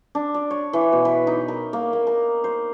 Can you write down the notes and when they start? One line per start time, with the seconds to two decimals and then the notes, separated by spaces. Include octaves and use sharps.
0.15 D4
0.34 D5
0.51 C#5
0.73 E3
0.92 B2
1.05 B4
1.27 D#4
1.48 A#4
1.73 A#3
1.93 A#3
2.07 A#4
2.44 C5